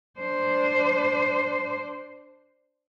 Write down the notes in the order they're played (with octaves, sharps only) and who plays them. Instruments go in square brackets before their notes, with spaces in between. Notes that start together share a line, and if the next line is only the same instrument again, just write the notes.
[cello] D4 C5